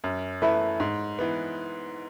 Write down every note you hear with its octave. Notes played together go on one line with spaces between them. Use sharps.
F#2
E3 A3 E4 B4
G#2
E3 B3